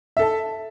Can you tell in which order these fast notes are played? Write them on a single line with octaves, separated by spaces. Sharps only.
E5 A4 A5